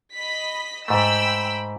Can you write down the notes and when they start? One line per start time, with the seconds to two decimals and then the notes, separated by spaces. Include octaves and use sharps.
0.15 D#5 B5 B6
0.88 G#2 A3 G5 B5 E6